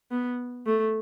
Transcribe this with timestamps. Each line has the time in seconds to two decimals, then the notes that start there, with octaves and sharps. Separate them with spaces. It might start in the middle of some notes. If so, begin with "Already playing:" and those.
0.11 B3
0.66 A3